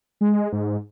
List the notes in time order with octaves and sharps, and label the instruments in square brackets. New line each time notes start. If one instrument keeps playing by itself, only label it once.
[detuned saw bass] G#3
G#2